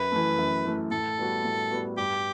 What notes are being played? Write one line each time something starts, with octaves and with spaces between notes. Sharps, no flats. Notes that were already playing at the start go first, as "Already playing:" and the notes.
Already playing: F#2 B4
E3 A3
F#2
E3 A3
A2 A4
G3 B3 F#4
A2
G3 B3 F#4
G2 G4